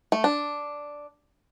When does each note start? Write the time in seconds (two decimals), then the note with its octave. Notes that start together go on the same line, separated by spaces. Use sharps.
0.12 A3
0.24 D4